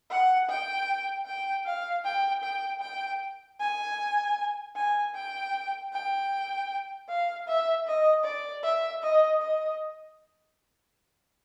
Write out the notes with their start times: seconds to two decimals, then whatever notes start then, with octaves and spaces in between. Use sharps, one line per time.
0.10 F#5
0.49 G5
1.26 G5
1.66 F5
2.05 G5
2.44 G5
2.82 G5
3.60 G#5
4.77 G#5
5.15 G5
5.93 G5
7.09 F5
7.48 E5
7.87 D#5
8.25 D5
8.64 E5
9.03 D#5
9.42 D#5